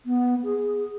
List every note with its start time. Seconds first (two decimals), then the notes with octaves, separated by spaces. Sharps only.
0.06 B3
0.44 G#4